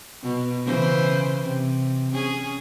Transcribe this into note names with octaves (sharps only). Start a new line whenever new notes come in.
B2
C#3 E3 C5
C3
C#4 G#4